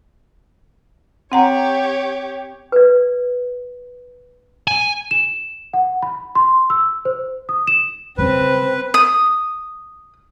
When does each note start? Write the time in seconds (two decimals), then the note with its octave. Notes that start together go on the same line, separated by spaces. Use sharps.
1.32 C4 G4 C#5 F#5 A#5
2.72 B4 D5
4.68 G#5
5.11 E7
5.73 F#5
6.02 B5
6.35 C6
6.70 E6
7.05 C5
7.49 D#6
7.67 E7
8.18 C#3 G3 C4 B4
8.94 D#6